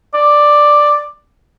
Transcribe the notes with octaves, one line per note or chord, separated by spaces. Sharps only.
D5